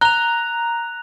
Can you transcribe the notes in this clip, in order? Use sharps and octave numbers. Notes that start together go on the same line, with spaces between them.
A#5 F#6 F7 G7